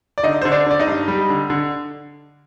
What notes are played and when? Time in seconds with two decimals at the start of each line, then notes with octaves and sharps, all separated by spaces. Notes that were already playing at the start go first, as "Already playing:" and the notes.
0.18 D5
0.23 D3 D#4 D#5
0.42 D3 C5
0.52 D4 D5
0.66 D3 D5
0.80 D#4 D#5
0.87 G2
1.08 G3
1.30 D3
1.50 D3